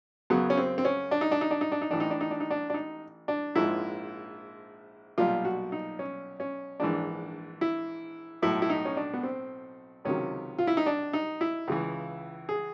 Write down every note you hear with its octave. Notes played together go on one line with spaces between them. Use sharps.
F#2 C#3 F#3 B3
C#4
C4
C4
C#4
D4
D#4
D4
D#4
D4
D#4
D4
D#4
A1 A2 E3 D4
D#4
D4
D#4
D4
D#4
D4
D4
D#4
D4
A#1 G#2 F3 G#3 E4
B1 A#2 G3 F4
F#4
D#4
C#4
C#4
A#1 G#2 E3 D4
E4
B1 A2 F#3 E4
E4
D#4
C#4
D4
B3
C4
C#2 C3 D#3 F#3 C#4
F4
E4
D#4
D4
D#4
E4
C#2 C#3 E3
G#4